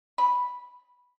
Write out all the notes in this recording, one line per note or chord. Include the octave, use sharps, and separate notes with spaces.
B5